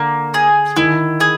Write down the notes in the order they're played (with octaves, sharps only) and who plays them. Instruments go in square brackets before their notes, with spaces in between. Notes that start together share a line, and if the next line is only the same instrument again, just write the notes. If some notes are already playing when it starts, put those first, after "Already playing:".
Already playing: [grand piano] D3 [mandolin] A#3
[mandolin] G#4
[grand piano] D#3 [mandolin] E4
[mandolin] G#4